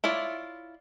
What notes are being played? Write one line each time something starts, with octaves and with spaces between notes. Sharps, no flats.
E4 F4 C#5 D5